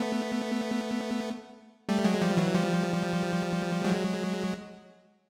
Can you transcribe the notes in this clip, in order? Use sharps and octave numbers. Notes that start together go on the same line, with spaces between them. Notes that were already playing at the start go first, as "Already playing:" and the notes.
Already playing: A3 B3
G3 A3
F#3 G#3
F3 G3
E3 F#3
F3 G3
F#3 G#3